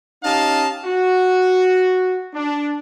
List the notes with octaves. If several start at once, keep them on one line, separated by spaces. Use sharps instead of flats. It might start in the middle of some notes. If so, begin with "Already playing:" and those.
C#4 D#4 G4 D#5 F5 A5
F#4
D4